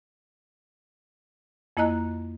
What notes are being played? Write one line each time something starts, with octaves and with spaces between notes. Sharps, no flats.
F2 A#3 E4 D#5 A#5 F#6